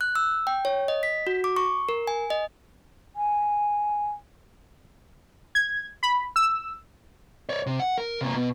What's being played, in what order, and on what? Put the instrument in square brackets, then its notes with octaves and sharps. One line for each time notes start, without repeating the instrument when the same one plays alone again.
[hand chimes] F#6
E6
G5
C#5
D#5
B6
F#4
D6
C#6
A#4
G#5
D#5
[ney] G#5
[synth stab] G#6
B5
E6
[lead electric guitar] C#5 D5
C3
F#5
A#4
C3 A#3
B2